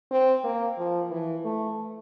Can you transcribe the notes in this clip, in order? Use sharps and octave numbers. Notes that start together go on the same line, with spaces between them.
C4
A#3
F3
E3
A3